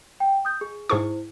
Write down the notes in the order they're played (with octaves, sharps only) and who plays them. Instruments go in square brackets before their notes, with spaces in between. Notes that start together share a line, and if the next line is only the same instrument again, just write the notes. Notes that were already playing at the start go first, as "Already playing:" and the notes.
[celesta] G5
D#6 G6
G#4
[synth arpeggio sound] G#2 G#4 C#6 [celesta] E4 C5